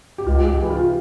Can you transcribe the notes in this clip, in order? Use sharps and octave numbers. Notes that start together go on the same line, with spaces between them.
G4
C#2 F4
C#2 G4 G#4
E3
F4
C3